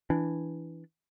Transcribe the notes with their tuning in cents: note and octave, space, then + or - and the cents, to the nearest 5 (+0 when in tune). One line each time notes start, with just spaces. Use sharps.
E3 +0 D4 -15